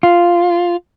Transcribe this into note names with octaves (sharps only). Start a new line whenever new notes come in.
F4